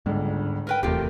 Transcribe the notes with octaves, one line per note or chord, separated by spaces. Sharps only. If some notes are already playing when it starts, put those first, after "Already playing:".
G1 C#2 G#2 D3
A#4 B4 G5
D#1 E2 C3 A3 F4 G4 A#4